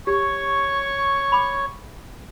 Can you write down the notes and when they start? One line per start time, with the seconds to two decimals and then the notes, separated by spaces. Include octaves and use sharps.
0.07 G4 C#5 C#6
1.32 B5 D6